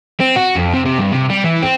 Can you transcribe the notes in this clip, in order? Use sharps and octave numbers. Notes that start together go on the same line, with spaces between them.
C4
F#4
F2
C3
C3
G2
C3
G3
E3
C4